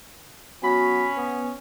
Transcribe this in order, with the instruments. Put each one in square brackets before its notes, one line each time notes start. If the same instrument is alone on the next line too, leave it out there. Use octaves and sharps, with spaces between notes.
[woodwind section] F#3 B3 F#4 [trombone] C#4 [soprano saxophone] B5
[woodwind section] B3